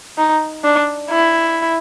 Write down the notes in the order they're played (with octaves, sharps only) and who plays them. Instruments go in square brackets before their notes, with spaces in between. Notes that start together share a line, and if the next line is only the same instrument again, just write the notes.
[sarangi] D#4
D4
E4